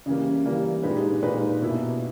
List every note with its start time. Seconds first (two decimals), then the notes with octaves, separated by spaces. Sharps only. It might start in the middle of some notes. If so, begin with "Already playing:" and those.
0.06 C#3 E3 G3 A#3
0.44 C#3 E3 G3 A#3
0.83 A#2 G#3 D#4 G4 B4
1.22 A#2 G#3 D#4 G4 B4
1.62 B2 A#3 E4